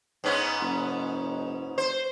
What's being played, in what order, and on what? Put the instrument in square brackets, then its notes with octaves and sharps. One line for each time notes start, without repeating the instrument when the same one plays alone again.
[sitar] G#2 B3 C#4
[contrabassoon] F#1
[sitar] C5